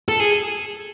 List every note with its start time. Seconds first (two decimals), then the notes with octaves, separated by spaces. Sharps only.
0.09 A4
0.20 G#4